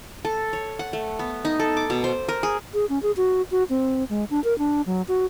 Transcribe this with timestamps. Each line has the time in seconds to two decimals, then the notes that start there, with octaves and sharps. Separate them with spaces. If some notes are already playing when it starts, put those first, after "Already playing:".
0.25 A4
0.53 C#5
0.79 F#5
0.93 A3
1.19 B3
1.45 D#4
1.60 A4
1.77 D6
1.90 B2
2.04 C5
2.29 A#4
2.43 G#4
2.74 G#4
2.89 C#4
3.03 G#4
3.17 F#4
3.51 F#4
3.69 C4
4.10 G#3
4.30 D4
4.44 A#4
4.59 D4
4.86 F#3
5.08 F#4